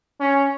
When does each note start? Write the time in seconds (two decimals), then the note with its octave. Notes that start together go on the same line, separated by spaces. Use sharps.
0.20 C#4